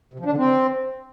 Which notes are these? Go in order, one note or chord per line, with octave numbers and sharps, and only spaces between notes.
C3
F3
D4
D3
C4